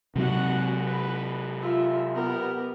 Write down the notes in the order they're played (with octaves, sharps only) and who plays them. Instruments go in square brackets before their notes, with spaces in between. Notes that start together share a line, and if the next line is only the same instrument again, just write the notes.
[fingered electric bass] C3 F#3 C4 [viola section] F#4 F#5
[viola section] B4
F4 E5
B3 G4 A#4